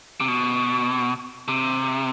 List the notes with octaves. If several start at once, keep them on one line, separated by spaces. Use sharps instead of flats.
C3
B2
C3